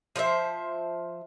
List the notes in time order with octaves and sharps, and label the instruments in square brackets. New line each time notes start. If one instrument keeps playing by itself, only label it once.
[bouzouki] F3 C5 D5 E5